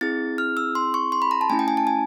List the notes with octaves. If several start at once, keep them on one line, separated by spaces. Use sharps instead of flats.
C4 E4 G#4 A6
F6
E6
C6
C#6
C6
B5
A#5
A5
A3 C#4 E4 G#5
G5
G#5
A5
G#5